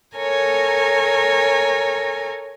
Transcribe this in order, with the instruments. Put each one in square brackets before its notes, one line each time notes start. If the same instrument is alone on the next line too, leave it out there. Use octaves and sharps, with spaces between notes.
[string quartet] A4 A#4 C#5 G#5 A#5